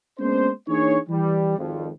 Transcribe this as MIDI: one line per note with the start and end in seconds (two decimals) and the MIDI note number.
0.19 0.49 56
0.19 0.49 58
0.19 0.49 59
0.19 0.49 61
0.19 0.49 62
0.19 0.49 72
0.68 0.98 52
0.68 0.98 58
0.68 0.98 62
0.68 0.98 63
0.68 0.98 68
0.68 0.98 73
1.09 1.56 52
1.09 1.56 55
1.58 1.88 32
1.58 1.88 41